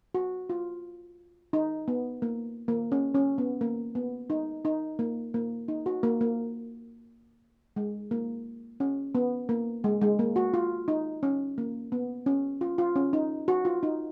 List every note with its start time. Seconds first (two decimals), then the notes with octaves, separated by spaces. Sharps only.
0.14 F#4
0.50 F4
1.53 D#4
1.88 B3
2.22 A#3
2.68 A#3
2.92 C#4
3.15 C#4
3.38 B3
3.61 A#3
3.95 B3
4.30 D#4
4.65 D#4
4.99 A#3
5.34 A#3
5.68 D#4
5.86 F#4
6.03 A#3
6.21 A#3
7.76 G#3
8.11 A#3
8.80 C#4
9.15 B3
9.49 A#3
9.84 G#3
10.01 G#3
10.19 A#3
10.36 F#4
10.54 F4
10.88 D#4
11.23 C#4
11.58 A#3
11.92 B3
12.26 C#4
12.61 F4
12.78 F4
12.96 C#4
13.13 D#4
13.48 F#4
13.65 F4
13.83 D#4